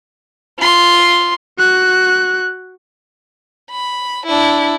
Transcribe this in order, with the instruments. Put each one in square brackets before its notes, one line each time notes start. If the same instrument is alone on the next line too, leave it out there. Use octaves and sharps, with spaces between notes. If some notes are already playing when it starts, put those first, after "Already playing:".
[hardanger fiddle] F4 C6
[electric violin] F#4 F#6
[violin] B5
D4 E4